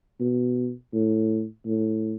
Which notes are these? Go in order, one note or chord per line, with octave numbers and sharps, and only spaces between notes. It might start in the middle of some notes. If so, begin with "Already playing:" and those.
B2
A2
A2